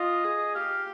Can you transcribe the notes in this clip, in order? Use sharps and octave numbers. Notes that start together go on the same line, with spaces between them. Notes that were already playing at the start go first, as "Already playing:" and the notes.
Already playing: F4 D#5
G#4
G4 F5